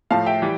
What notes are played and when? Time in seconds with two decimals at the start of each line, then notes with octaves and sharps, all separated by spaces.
0.11 A2 F3 F5 A5
0.26 E5 G5
0.42 E3 G3